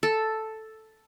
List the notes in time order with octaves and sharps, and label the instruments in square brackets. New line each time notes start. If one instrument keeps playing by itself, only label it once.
[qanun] A4